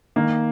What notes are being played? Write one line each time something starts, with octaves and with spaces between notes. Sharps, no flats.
D#3 A#3